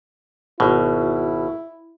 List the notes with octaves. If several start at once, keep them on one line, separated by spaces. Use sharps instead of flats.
G#1 B2 E4